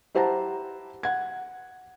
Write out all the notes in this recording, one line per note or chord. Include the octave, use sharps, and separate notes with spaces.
E4 G4 C5 F#5 A5 A#5
F#5 G#6